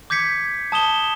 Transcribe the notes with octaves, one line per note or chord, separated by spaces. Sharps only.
D6 G6 G#6 B6 C#7
A5 D#6 E7 G7